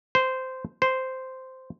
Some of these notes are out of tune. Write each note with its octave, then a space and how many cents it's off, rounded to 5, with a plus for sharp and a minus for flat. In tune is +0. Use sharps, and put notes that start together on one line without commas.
C5 -10
C5 -5